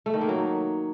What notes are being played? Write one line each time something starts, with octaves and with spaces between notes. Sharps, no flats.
A3
D#3
A#3
F#3